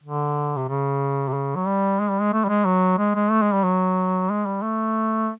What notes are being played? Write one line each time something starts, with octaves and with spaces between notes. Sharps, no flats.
D3
C3
C#3
C3
C#3
F#3
G3
G#3
G3
G#3
A3
G3
G#3
F#3
G#3
G#3
A3
G#3
G3
F#3
G#3
G3
A3